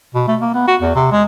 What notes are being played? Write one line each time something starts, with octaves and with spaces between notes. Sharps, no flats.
B2
A3
A#3
B3
F#4
E2
C3
G#3